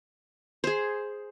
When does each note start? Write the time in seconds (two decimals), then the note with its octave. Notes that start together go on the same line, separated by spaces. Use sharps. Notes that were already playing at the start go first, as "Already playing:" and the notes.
0.64 G#4 C5